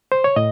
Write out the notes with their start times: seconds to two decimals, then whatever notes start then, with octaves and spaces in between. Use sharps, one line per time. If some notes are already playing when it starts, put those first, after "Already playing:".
0.12 C5
0.24 C#5
0.36 A2 D#5